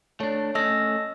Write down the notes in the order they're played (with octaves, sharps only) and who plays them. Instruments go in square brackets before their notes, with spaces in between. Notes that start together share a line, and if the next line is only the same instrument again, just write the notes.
[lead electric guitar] A3 D4 [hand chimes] C#5
[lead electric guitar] A3 C#4 [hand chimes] D#5 E6 A#6